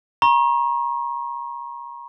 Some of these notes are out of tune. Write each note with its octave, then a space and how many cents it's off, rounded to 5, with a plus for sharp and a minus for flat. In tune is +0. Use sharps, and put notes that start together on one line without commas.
A#5 +35 C#6 -35